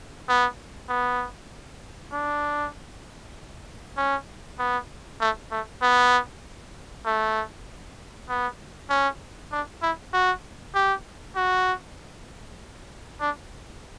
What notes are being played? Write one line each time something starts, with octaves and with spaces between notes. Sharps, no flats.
B3
B3
D4
C#4
B3
A3
A3
B3
A3
B3
C#4
D4
E4
F#4
G4
F#4
D4